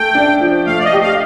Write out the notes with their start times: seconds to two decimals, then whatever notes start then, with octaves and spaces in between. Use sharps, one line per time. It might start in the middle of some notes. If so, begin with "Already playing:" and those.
Already playing: A3 A4 G5
0.15 D4
0.41 F3
0.67 A3 F5
0.79 D5
0.84 D#5
0.93 G4
1.02 F5